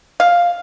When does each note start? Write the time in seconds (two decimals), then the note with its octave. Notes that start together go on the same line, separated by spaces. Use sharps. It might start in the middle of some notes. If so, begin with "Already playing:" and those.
0.20 F5